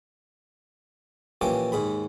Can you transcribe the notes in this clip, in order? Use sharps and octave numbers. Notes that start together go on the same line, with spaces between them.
A#2 E3 F3 A#3 C#4 G4
D#2 G#2 G#4 B5